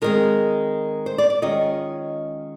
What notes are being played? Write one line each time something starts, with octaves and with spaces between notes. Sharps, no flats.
D#3 G#3 C4 A#4
C5
D5
D5
D#3 G#3 C#4 F4 D#5